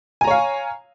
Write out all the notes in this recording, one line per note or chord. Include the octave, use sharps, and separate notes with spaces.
C#5 F5 G#5 A#5